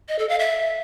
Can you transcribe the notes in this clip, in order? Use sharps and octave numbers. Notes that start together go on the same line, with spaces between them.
D#5
A4
F5
E5